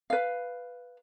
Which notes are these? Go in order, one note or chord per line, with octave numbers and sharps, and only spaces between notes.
B4 F5